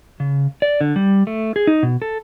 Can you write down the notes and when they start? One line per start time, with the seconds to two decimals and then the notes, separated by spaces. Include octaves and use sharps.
0.20 C#3
0.62 D5
0.81 D3
0.96 G3
1.27 A3
1.56 G#4
1.67 D#4
1.83 B2
2.02 A4